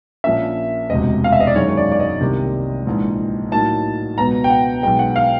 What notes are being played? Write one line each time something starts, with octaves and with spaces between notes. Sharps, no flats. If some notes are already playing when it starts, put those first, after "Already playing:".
A#1 A#2 F3 A#3 C#4 E5
E1 D2 C3 D#5
F5
E5
D#5
D5
F#2 D#3 G#3 C#4 C#5
C#5
D5
D5
D#5
C2 C3 D#3 G3 A#3
A#1 G#2 E3
A2 F#3 A#3 D#4 A5
C#2 B2 F#3 B3 A#5
G5
F#5
B1 B2 G#3 G5
F#5
F5